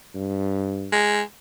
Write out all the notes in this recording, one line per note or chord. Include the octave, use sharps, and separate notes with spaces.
G2
G#3